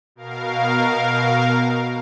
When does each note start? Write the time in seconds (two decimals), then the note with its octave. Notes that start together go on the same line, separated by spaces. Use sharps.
0.16 B2 A#4 F5